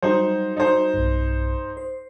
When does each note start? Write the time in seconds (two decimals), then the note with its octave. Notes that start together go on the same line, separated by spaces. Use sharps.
0.02 F#3 G3 D#4 F#4 C5
0.57 D#4 C5
0.94 B1 G2
1.77 C5